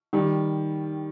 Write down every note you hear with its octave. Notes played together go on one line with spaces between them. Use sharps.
D#3 G3